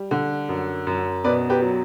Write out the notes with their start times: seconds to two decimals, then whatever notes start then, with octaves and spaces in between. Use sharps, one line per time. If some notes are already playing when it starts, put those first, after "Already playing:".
Already playing: G3
0.11 D3
0.49 F#2
0.87 F#2
1.24 B2 B4 D5
1.50 G4 B4
1.62 F#3